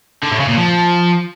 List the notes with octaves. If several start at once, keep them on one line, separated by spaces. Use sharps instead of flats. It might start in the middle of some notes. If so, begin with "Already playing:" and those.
D3
A2
C#3
A#2
F3